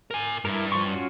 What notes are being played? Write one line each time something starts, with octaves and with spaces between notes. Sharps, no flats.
A#4 G#5
G2 E4 A#4
F3 C6 C#6
C#4 F4 F#4